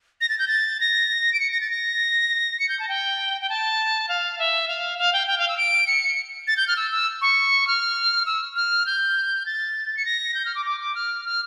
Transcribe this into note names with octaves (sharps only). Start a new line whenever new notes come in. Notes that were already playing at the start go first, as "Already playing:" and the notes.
A#6
A6
G6
A6
A#6
D7
C#7
A#6
A6
A#6
C#7
G6
A5
G5
G5
A5
F5
E5
F5
F5
G5
G5
F5
E6
D7
C#7
A6
G6
F6
E6
E6
C#6
F6
E6
F6
G6
A6
C#7
A#6
G6
F6
D6
D6
D6
F6
F6